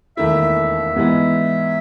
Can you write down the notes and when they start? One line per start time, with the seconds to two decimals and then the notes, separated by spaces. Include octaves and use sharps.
0.17 E1 D#2 D#3 A3 E4 E5
0.96 G#2 E3 G#3 B3